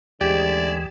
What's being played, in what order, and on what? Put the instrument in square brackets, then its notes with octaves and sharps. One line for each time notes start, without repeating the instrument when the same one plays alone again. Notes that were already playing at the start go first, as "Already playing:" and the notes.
[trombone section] A1 D3 G#3 [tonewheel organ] D#2 E3 [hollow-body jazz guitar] G4 [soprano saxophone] D5